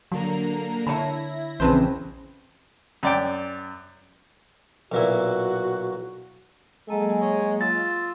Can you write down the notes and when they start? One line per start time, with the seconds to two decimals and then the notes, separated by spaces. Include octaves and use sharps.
0.12 D3 F#3 A#3 A#5
0.87 D3 E4 C#5 A5 B5 A#6
1.60 A#1 E2 C#3 C4 B4 C5 A5
3.03 F#2 D5 G5
4.92 B1 A#2 E4 F#4
6.89 F#3 G#3 A#3 A4 G#5
7.21 C#5 D#5
7.61 F4 E6 A6